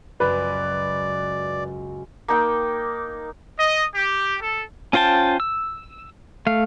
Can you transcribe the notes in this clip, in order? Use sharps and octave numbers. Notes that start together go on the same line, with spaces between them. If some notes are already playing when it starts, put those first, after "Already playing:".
C#2 F#2 B4 D5
A#3 D#4 G5
D#5
G4
A4
C#4 F4 C5 G5 A5
E6
A3 F5